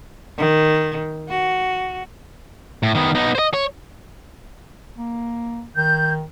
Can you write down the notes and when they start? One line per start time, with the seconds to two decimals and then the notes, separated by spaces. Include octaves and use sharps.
0.37 D#3
1.29 F#4
2.83 A2
2.95 D#3 B3
3.15 B3 D#4
3.35 C5 D#5
3.54 C#5
4.97 A#3
5.77 D#3 G6